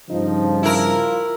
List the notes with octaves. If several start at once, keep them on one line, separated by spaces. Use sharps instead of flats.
G2 C#3 F3 D#4
E4 F4 A#4